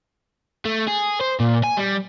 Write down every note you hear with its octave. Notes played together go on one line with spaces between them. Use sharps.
A3
G#4
C5
A#2
G#5
G3